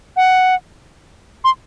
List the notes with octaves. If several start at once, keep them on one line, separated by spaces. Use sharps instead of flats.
F#5
C6